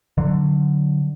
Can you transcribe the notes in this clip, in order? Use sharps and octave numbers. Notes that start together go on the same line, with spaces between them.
D3 F#3